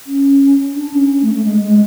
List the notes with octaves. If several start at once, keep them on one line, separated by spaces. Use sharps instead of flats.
C#4
D4
C#4
A3
A3
G#3
G#3